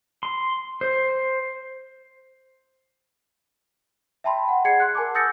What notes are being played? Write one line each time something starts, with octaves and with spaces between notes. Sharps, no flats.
C6
C5
E5 G5 A5 B5 C6
F#5
G#4 D5 F#5 G#6 C7 C#7
C6 F#6
A#4 G#5 A5 D6
D#6 E6 G6 A6 A#6 C#7